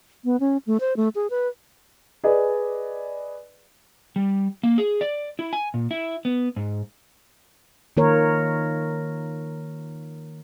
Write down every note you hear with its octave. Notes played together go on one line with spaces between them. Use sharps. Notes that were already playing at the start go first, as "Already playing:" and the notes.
B3
C#4
A3
C5
A3
G#4
B4
G#4 B4 D5 D#5 G#5
G3
A#3
G#4
D5
E4
G#5
A#2
E4
B3
G#2
D#3 A#3 F4 A#4 C#5